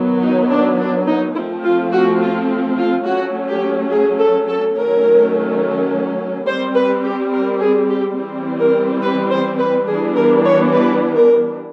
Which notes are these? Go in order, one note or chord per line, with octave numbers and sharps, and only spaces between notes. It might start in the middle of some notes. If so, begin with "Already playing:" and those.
Already playing: D#3 F#3 B3
D#4
D4
D4
D#4
F3 A3 C4 E4
F4
F#4
F4
F4
F#3 A3 C#4 F#4
G4
G#4
A4
A4
D#3 F#3 A3 C#4 A#4
G3 C4 C5
B4
G4
A#4
G#4
G4
E3 G3 C4
A#4
B4
C5
B4
E3 G3 B3 D4 G#4
A#4
C#5
B4
A#4